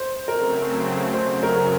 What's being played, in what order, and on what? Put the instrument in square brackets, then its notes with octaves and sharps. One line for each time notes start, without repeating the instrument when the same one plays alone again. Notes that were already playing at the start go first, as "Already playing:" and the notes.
Already playing: [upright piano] C5
[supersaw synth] C#3 F#3 A3 C4 [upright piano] A#4
[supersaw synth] F#2 C#3 F#3 [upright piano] C5
[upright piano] A#4